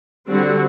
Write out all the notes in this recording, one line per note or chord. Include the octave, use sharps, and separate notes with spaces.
D3 G3 C4 F#4